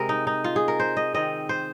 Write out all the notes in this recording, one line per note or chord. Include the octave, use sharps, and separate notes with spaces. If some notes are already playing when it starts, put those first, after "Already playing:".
Already playing: C3 G#3 C4 A#4 D#5
D#4
D#4
F4
G#4
A#4
C5
D#5
D#3 C4 D#5
C5